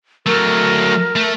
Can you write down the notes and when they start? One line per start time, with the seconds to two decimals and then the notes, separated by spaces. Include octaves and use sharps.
0.26 F#3 A3 A#4
1.16 A3